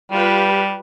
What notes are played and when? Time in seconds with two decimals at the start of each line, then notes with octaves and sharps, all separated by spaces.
0.11 G3 F4 G4 B4